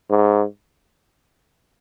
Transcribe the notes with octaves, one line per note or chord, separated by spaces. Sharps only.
G#2